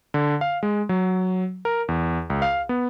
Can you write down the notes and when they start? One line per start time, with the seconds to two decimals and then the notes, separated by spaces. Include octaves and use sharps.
0.14 D3
0.41 F5
0.63 G#3
0.89 F#3
1.65 A#4
1.88 E2
2.30 C#2
2.42 F5
2.69 B3